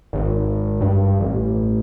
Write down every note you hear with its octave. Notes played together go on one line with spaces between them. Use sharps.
G#1
G2
A1